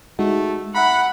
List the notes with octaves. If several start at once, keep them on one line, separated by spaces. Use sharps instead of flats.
G#3 A3 D#4 F#4
E5 F#5 A#5 B5